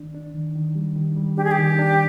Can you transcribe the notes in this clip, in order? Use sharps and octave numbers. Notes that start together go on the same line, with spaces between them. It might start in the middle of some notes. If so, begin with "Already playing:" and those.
Already playing: D#3 D4
D4
D#3
D#3
G3
D#3
G3
D4 G4
G#4
G4
D#3
D4